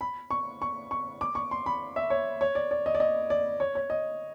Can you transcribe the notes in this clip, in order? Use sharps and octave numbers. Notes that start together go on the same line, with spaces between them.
B5
C#6
C#6
C#6
D6
C#6
C6
B5
E5
C#5
C#5
D5
D5
D#5
D5
D#5
D5
C#5
C#5
D#5